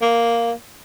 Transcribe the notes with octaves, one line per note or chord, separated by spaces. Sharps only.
A#3